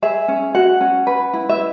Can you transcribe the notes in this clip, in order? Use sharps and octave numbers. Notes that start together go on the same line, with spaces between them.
G#4 E5
C#4
F#4 F#5
C#4
B4
E4
E5